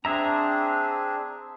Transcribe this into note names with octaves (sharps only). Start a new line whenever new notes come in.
C4 D4 G#4 E5 A#5